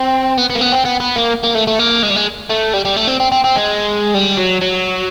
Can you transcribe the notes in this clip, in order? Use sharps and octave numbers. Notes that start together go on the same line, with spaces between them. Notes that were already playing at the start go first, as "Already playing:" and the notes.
Already playing: C4
B3
B3
A#3
B3
C4
B3
B3
A#3
A#3
A3
A3
A#3
G#3
G3
G#3
A3
G3
G3
A3
C4
C4
C4
C4
G#3
G3
F#3
F#3